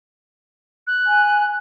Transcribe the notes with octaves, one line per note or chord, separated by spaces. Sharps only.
F#6
G#5